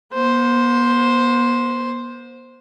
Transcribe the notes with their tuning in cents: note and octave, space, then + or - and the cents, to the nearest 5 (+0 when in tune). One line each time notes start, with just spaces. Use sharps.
B3 -45 C5 +0